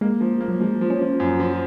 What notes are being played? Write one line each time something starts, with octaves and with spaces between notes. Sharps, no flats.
G#3 A#3
F3
A#3
F#3
F3 G#3
F3
C#4
F3
F#2
F3